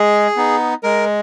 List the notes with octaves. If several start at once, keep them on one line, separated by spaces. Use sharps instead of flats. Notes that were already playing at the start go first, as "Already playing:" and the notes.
Already playing: G#3 G#4
B3 D#4
G#3 A#4